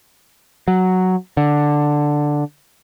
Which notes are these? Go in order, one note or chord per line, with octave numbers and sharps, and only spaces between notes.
F#3
D3